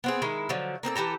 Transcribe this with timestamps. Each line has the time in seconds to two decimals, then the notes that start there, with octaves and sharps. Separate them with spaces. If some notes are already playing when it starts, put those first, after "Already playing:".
0.04 B3 C4 G#4
0.22 D#3 G#3 E4
0.49 D3 F3 F#3
0.83 A#3 C4 G#4 A4
0.95 E3 G4 A4 A#5